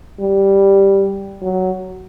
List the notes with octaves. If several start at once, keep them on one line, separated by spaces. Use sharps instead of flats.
G3
F#3